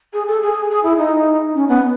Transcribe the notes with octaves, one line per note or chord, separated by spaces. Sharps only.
G#4
A4
G#4
G#4
E4
D#4
C#4
B3